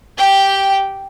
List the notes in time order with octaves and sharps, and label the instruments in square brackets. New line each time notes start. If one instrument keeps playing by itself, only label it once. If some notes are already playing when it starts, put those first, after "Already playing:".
[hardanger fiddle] G4 G5